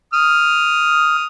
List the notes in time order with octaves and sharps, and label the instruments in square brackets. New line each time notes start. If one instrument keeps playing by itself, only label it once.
[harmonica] D#6 F6